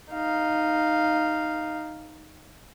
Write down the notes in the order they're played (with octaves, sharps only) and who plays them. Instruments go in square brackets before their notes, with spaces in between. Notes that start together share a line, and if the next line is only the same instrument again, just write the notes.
[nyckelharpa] D#4 F5